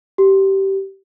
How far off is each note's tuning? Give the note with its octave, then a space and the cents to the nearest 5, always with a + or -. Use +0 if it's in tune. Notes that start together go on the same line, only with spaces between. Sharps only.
G4 -20